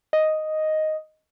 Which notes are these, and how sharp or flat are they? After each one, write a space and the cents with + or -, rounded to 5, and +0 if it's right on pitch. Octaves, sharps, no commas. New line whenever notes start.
D#5 +0